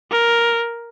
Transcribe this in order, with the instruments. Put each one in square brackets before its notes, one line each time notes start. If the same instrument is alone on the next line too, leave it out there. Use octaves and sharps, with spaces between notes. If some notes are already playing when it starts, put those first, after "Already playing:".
[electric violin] A#4